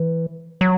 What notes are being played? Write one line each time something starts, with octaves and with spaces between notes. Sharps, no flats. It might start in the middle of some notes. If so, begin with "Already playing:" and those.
Already playing: E3
F#3